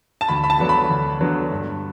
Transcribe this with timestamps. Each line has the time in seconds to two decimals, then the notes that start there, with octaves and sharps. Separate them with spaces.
0.21 A5
0.28 D2 B5
0.44 B5
0.50 A5
0.59 D3 F#3 B3 D4
0.69 B5
0.89 D2
1.21 D3 F#3 B3 D4
1.52 G2